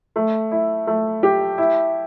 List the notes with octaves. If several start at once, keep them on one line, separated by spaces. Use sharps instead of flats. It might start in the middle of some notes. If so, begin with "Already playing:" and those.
A3
E4
A3
G4
E4